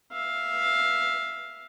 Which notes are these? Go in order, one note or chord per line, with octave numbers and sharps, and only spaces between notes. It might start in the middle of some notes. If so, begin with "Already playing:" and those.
E5 F5